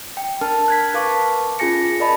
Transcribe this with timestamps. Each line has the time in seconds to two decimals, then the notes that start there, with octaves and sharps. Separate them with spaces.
0.17 G5
0.41 D4 A#4 A5 F6
0.68 F#6 G#6 B6
0.94 A#4 B4 F5 A5 C#6 D6
1.59 C#4 F4 G#4 G#5 A#6 C#7
2.00 A#4 D5 D#5 A5 B5